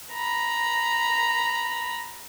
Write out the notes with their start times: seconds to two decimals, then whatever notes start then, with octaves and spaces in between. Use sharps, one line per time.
0.13 A#5 B5